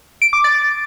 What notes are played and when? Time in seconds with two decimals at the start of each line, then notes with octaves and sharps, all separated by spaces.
0.22 D7
0.33 D6
0.44 A6